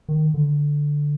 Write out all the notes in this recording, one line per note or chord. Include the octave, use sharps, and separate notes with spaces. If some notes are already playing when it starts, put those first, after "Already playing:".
D#3
D3